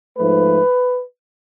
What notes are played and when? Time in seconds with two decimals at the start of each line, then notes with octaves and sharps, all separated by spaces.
0.17 G#2 F3 A3 B4